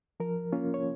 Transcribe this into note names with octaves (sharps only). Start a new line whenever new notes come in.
F3 A#4
A#3 C#4 F4
C#5